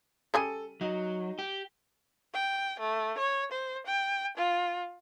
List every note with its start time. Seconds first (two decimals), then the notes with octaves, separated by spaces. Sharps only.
0.34 C#3 G3 G#4 A4 D#7
0.81 F#3 D#4
1.39 G4
2.34 G5
2.80 A3
3.18 C#5
3.52 C5
3.86 G5
4.37 F4